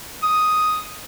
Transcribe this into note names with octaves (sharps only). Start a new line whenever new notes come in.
D#6